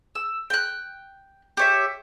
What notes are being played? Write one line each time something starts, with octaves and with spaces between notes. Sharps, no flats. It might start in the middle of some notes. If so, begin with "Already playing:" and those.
E6
G5 F#6
G4 C#5 E5